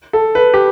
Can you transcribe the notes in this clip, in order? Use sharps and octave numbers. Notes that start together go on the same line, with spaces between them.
A4
B4
G4